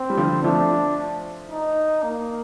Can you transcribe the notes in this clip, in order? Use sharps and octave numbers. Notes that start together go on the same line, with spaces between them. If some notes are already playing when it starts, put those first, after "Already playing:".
Already playing: C4
G3
D3 F3
F3 A3 D4
D#4
A#3